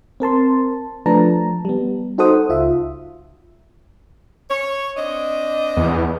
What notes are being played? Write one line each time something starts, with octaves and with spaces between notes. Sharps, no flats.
C4 A#4 A5 C6
F3 A3 D4 B4 A5 A#5
G3 B3
D#4 F#4 A4 C5 F#5 D#6
C#2 F4 E5
C#5
C4 D4 D#5
E2